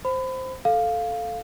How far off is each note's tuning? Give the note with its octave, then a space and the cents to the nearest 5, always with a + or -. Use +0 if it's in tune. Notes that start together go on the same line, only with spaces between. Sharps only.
C5 +0 B5 +30
A4 +0 F5 +0